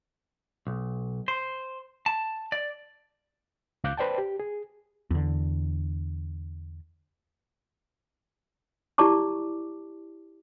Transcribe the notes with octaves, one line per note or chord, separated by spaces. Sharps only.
B1
C5
A5
D5
C#2 F5 D6 F#6 G6
B4 C5 D5 G5 A5
G4
G#4
E2 D3
E4 G4 D5 A5 C#6 D6